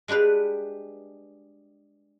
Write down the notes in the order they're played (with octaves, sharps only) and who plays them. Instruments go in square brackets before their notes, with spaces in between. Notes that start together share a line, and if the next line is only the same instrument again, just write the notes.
[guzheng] G#3 D4 G4 B4 F5